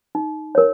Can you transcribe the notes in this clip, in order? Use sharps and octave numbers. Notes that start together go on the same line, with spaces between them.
D#4
A#4 C#5